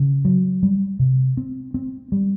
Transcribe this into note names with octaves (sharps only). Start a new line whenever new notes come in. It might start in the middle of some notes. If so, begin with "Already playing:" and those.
Already playing: C#3
F#3
G3
C3
C4
C4
G3